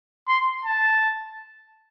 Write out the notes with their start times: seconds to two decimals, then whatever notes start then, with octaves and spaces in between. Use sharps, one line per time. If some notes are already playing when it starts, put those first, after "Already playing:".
0.28 C6
0.65 A5